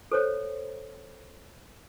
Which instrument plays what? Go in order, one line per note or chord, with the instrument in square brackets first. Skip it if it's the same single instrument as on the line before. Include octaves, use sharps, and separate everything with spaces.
[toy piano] A4 C5 C#5